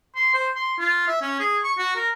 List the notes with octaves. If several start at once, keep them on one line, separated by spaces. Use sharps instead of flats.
C6
C5
C6
F4
E5
C#4
G#4
C#6
F#4
A#4